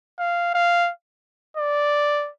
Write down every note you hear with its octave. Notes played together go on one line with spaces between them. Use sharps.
F5
F5
D5